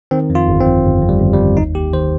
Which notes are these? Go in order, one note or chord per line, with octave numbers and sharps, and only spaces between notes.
D#3 C4
F2
F4
G1
C4
F2
G1
F2
G3
G1
G3
G1
D#2 D#4
D#2 G4
D#3 C5